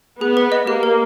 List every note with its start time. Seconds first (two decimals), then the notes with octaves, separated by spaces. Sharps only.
0.21 B3 G#4
0.37 B4
0.52 D#5
0.67 A#3 G4
0.83 A#4